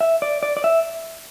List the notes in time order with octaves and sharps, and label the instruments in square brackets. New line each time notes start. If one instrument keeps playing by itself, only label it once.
[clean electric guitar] E5
D5
D5
D5
E5